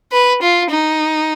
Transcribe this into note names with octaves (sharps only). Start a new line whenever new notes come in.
B4
F4
D#4